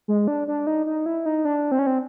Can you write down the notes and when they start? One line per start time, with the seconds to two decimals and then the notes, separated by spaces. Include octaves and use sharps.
0.08 G#3
0.28 D4
0.48 D4
0.67 D#4
0.86 D#4
1.06 E4
1.26 D#4
1.45 D4
1.72 C4
1.79 C#4
1.87 C4